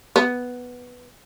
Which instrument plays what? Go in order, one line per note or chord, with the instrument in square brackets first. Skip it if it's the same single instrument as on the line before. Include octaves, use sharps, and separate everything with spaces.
[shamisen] B3